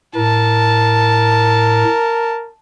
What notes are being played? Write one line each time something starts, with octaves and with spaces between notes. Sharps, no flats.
A2 A#4 A5